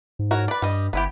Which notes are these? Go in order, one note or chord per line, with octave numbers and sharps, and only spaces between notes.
G#2
F#4 A#4 C#5
B4 D5
G2 G3 D#5
G1 B3 E4 G4